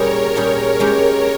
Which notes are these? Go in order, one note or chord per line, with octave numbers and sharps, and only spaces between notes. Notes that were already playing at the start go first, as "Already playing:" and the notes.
Already playing: A#2 G3 C#4 G#4 A#4 C#5
A#2 G3 C#4 G#4
G#3 C#4 G4